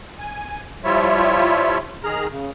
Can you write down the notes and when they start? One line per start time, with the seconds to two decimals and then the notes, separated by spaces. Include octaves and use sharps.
0.19 G#5
0.84 F3 G3 E4 F4 C#5 E5
2.04 D#3 G#4 A#5 F6
2.30 C#3